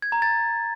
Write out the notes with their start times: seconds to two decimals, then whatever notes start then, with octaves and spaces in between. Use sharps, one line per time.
0.02 G#6
0.12 A#5
0.22 A6